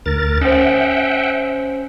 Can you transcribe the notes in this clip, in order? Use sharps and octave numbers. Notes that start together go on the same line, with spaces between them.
D2 A#4 A6
C#4 C5 E5 F#5 G5